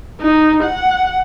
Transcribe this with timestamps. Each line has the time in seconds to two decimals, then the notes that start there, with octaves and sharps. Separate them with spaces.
0.21 D#4
0.64 F#5